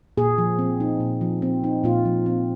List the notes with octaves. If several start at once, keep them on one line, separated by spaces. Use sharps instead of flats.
A#2 G#4
F3
C4
D#4
A#2
F3
C4
D#4
A#2 F4
F3
C4